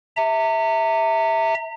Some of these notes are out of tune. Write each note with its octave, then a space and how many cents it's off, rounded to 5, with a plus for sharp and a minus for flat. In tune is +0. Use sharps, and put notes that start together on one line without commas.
E5 -15 A#5 -40